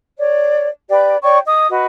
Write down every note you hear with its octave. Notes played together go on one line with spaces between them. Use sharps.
C#5 D5
G4 B4 D5
C#5 D5 G5 C#6
D#5 D#6
F#4 B4 D#5